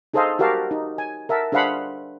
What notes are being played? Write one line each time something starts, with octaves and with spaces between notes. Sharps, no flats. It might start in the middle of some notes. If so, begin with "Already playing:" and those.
D#4 G#4 A4 C5 D#5 F5
F#4 G4 A#4 F5 A5
D#4
G#5
A#4 E5 F#5 A5
D4 G#4 C5 F5 F#5 B5